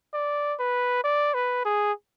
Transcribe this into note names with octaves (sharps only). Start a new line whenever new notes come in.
D5
B4
D5
B4
G#4